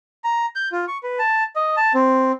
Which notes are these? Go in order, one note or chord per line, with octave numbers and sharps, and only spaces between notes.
A#5
G6
F4
C#6
B4
A5
D#5
A5
C4